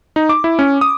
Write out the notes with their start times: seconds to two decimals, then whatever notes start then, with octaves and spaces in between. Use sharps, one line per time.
0.16 D#4
0.29 D6
0.44 E4
0.59 C#4
0.81 D#6